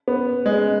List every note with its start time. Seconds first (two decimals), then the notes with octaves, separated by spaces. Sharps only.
0.08 B3
0.46 G#3